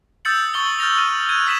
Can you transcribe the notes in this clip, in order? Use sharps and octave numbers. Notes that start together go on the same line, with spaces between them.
D#6 E6 G6 A6 C#7 F#7
C#6 E6 G6 A6 G7
F6 G6 A6 A#6 F7
D#7
F#6 G#6 D#7
D#6 F6 B6 D#7 E7 F#7